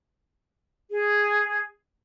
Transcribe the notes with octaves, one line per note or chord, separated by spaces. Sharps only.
G#4